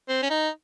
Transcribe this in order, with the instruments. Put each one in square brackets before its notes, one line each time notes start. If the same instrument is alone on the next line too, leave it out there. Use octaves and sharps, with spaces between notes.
[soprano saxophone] C4
C#4
D#4